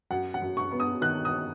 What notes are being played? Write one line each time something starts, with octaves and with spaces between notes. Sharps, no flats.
F#2 F#5
F#5
F#2
C#6
B3
D#6
D#3 F#6
D#6